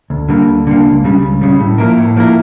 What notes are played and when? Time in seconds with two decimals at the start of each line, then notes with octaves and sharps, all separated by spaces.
0.10 D2
0.29 D3 G3 A#3
0.48 D2
0.67 D3 G3 A#3
0.85 C#2
1.04 C#3 G3
1.22 C#2
1.41 C#3 G3
1.60 A2
1.78 F3 A#3 E4 A#4
1.97 A2
2.16 F3 A#3 E4 A#4